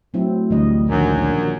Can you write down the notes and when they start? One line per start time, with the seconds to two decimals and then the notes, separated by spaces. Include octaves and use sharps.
0.14 A2 F#3 C4 E4
0.50 A1 D2 D3 G3 D#5
0.90 A#1 F#2 D#3